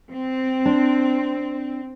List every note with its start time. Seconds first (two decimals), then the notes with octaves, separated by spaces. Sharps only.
0.12 C4
0.65 D4